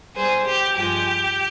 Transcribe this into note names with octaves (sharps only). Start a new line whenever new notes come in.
B2 G3 G#4 C5
G4
G2 F3 G#3 G4